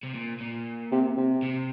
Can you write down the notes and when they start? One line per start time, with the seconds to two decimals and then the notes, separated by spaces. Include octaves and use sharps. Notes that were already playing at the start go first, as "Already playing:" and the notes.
0.03 C3
0.14 A#2
0.40 A#2
0.92 C3
1.17 C3
1.43 C3